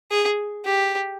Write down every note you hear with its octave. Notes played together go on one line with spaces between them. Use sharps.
G#4
G4